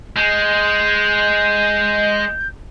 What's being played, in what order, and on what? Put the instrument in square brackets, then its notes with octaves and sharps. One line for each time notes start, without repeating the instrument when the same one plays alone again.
[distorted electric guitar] G#3 [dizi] G6